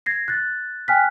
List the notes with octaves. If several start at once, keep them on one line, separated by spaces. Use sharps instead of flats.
G#6 A#6 C7
F#6 A6
G5 G#5 F6 F#6 B6